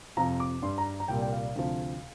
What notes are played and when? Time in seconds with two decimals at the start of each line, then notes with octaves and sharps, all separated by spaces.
0.17 F2 C3 F3 A#5
0.40 D6
0.62 G2 G3 C6
0.78 A#5
1.00 A#5
1.08 C2 A#2 G3 G5
1.22 G5
1.32 F5
1.56 D2 C3 F3